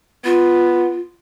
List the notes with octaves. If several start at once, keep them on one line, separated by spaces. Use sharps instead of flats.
B3 F4